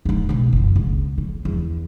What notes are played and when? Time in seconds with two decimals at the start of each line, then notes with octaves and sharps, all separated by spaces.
0.05 D1 D#4
0.29 C2 B2
0.53 F#1 F4
0.76 C#2
1.18 C#3
1.45 E2